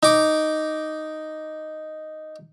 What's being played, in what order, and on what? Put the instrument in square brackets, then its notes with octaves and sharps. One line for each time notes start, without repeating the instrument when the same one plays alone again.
[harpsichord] D#4 D6